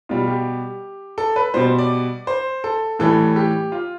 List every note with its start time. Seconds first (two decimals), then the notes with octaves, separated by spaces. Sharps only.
0.09 B2 G3 F4
0.28 G4
1.18 A4
1.36 B4
1.54 B2 G3 C5
1.79 D5
2.27 C5
2.64 A4
2.99 A2 E3 G3 A4
3.36 G4
3.72 F4